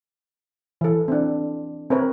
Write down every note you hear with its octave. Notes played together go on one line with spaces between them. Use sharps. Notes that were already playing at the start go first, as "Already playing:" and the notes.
E3 A4
C4 D4
C4 A#4 B4 C#5